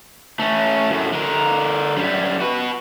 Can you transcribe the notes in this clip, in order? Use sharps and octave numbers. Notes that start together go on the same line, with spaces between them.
A3 C#4
F#2 A2
D3 A#4
F#2 G3
F#4 B4